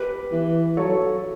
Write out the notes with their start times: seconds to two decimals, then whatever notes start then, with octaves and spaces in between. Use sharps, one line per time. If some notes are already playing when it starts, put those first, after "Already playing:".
Already playing: G4 B4
0.32 E3
0.77 F#3 A4 C#5